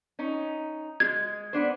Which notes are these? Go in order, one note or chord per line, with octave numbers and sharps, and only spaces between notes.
C#4 D#4
G#3 G#6
B3 D4 C5